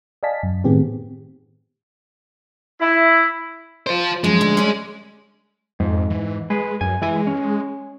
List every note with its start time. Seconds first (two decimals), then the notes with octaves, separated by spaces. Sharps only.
0.23 D5 D#5 F5 G#5 A5 B6
0.43 F#2
0.64 A2 D#3 B3 C4 G4 G#4
2.80 E4
3.87 F4 C5
4.24 F#2 F3 G#3
4.41 D2
4.57 G3 C#4
5.80 F2 G#2
6.10 E3
6.50 G#3 G#4 B4
6.81 F#2 G#5
7.02 E3 G#3 E4 G#5
7.27 C#4